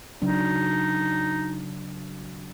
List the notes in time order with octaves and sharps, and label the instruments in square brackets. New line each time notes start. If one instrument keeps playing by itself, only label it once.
[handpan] C#3 F#3 D4 [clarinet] D#4